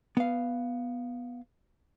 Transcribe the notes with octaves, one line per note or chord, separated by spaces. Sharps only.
B3 F5